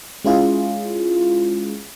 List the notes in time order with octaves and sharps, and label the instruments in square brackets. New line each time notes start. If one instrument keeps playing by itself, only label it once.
[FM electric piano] G#3 C#4 E4 F4 G#4